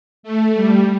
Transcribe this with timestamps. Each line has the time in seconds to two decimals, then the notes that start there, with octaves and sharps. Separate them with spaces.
0.23 A3
0.55 G3